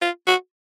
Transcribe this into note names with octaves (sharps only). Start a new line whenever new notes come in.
F4
F#4